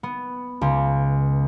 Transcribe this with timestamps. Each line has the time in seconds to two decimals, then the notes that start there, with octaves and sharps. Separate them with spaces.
0.03 B3
0.61 C#2